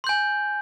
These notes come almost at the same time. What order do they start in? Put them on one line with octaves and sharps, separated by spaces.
C6 G6 G#5